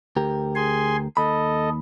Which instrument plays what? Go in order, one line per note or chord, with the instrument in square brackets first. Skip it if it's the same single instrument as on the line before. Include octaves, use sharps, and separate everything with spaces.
[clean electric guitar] D2 G4 A#4
[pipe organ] G#4 G#5 C6
[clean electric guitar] D#2 B5 [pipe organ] A4 D#5